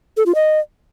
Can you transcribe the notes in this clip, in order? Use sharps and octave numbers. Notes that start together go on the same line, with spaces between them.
A4
F4
D#5